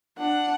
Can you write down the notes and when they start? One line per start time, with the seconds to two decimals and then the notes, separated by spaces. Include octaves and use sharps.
0.18 D4 F#5